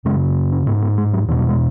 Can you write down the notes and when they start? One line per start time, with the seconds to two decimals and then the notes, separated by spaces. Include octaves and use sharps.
0.05 F#2 C#3 G#3
0.52 C#4
0.67 G#2 B3
0.82 B3
0.98 G#3
1.13 F#3
1.28 E2 E3
1.31 B2
1.38 F#3
1.49 G#3